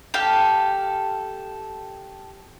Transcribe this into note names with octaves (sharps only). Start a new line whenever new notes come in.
G4 A4 F5